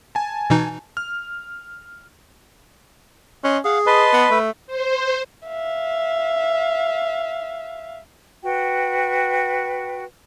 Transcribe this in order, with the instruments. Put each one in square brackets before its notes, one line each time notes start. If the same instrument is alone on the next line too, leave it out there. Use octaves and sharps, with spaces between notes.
[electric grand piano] G#5 A5
[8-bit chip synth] B2 E3 D#4
[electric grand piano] F6
[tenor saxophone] C#4 [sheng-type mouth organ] D#5 C6 F#6
[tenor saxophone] G#4 [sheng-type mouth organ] F5 F#5
[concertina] B4 [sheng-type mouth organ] D#5 A5 C6
[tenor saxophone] B3
A3
[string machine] C5
[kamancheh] E5 F5
[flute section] F#4 B4 G5